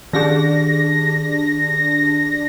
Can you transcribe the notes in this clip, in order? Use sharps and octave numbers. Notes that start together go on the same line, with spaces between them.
D#3 D4 G4 G#4 A#6